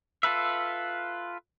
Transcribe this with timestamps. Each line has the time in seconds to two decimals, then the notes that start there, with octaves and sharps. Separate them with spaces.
0.23 F4 A4 B4 E5